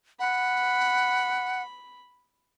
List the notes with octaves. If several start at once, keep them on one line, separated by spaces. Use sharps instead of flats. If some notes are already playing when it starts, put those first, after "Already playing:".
F#5 B5